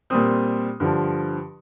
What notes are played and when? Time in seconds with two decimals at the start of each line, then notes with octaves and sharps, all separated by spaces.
0.10 A#2 G3 C4 D#6
0.80 G2 D3 F3